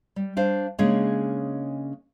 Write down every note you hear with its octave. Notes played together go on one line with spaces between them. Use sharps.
G3
D4 C5 F5
C#3 G#3 A#3 C#4 D4